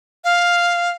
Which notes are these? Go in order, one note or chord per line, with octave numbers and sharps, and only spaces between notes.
F5